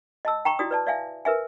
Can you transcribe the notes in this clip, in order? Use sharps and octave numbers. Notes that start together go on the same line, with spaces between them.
D#5 A5 E6
G5 A#5 C#6
E4 F#4 D5 D#6
B4 D5 A5
D5 E5 F5 G#5
A#4 B4 E5 G#5